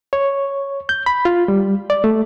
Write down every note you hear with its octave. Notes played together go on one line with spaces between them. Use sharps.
C#5
G6
B5
F4
G3
D5
A3